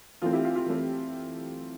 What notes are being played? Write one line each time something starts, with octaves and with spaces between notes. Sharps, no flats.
E3 A3 C4 F4
E4 G4
F4
F4
E3 A3 C4